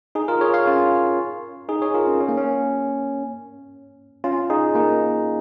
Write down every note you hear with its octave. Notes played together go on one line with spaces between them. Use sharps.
D#4 G#4
F4 A#4
G#4 C#5
C#5 F5
C#4 F4
D#4 G#4
G#4 C#5
F4 A#4
C#4
C#4
A#3
C#4
C#4 F4
D#4 G#4
A#3 D#4